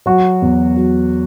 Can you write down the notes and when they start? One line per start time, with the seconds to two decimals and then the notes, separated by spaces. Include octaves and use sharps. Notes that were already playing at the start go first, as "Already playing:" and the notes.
0.06 F#3 F#4
0.42 E2
0.76 F#3